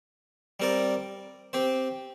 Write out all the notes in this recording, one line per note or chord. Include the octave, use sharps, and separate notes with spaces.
G3 C4 A#4 D5
C4 G4 C5